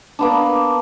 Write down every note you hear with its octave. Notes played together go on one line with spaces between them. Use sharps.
A#3 B3 D4